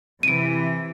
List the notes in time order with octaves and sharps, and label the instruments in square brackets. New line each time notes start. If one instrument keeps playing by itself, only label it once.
[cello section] C3 E3 [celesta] D7 D#7